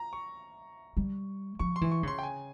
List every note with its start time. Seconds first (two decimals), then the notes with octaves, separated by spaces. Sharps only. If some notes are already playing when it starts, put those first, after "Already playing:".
Already playing: A#5
0.13 C#6
0.97 G3
1.59 F3 C#6
1.76 C6
1.81 E3
1.91 C#6
2.03 C#3 C6
2.19 G5
2.23 G#5